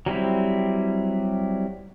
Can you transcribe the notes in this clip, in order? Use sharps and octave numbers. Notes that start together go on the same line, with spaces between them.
F#3 G3 C4 E4